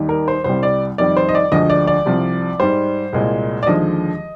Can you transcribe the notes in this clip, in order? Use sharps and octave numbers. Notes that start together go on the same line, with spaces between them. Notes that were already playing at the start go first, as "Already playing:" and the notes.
Already playing: D#2 D#3 G3
A#4
C5
C2 C3 G3 C5
D5
F2 D#3 G3 D5
C5
D#5
D5
D2 D3 F3 G#3 D#5
D5
D5
C2 C3 F3
G#2 G3 C5
C2 A#2 G#3
D5
D#2 D3 F3 G#3 D#5